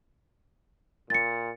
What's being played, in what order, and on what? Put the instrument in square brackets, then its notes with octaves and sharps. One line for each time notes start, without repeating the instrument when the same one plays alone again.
[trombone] A#2 [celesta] A6 C#7